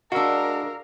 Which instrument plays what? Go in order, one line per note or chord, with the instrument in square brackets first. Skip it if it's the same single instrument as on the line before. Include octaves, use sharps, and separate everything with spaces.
[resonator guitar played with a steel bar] G#3 D4 [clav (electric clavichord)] F#4 [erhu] A#4 [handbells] F5 E6